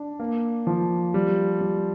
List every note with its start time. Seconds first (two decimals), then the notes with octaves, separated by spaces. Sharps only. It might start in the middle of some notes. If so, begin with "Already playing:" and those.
Already playing: D4
0.20 A#3
0.67 F3
1.14 G3
1.61 G3